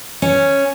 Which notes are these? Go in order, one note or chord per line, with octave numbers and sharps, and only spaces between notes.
C#4